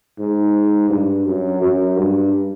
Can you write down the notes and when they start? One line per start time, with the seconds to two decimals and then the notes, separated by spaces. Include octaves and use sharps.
0.19 G#2
0.90 G2
1.26 F#2
1.62 F#2
1.97 G2